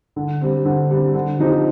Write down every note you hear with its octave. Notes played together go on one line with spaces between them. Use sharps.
D3
G3 C4
D3
G3 C4
D3
F3 C4 D#4 G4